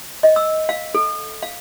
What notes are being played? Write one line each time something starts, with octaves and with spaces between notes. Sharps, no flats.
D#5
E6
F5
A4
F5